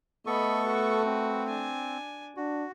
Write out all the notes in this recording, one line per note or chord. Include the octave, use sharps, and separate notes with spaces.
A3 B3 A4 D#5 B5 C#6
F#4 B4
C4
D4 G#5
D4 F#4